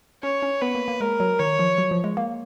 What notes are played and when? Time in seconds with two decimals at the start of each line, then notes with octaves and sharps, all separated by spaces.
0.23 C#4 C#5
0.42 C#4
0.62 B3 B4
0.75 A#3
0.88 A#3
1.00 G#3 A#4
1.20 F#3
1.39 D#3 C#5
1.59 F3
1.78 F#3
1.91 F3
2.04 G#3
2.17 A#3